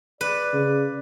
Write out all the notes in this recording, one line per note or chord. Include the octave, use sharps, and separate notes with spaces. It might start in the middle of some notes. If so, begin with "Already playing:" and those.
B4 D5
C#3